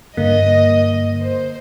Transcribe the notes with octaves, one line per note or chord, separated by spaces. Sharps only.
G2 D3 A#3 D#5
C5